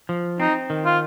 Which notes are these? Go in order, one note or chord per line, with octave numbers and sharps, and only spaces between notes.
F3
C4 D#4
D#3
F4